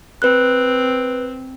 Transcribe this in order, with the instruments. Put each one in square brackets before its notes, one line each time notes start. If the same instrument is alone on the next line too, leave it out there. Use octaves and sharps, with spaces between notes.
[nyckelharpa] C4 [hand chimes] B4 F#6